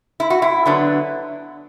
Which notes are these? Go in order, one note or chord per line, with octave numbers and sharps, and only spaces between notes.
E4
F#4
E4
D3 F#3 B3 D4